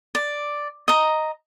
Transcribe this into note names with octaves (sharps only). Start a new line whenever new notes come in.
D5
D#5 A#5